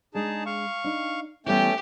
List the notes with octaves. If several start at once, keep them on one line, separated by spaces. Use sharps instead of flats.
G#3 D4 D#4 G#4 A5
F5 C#6
D4 D#4
E3 G3 A3 B3 C#4 G4 G5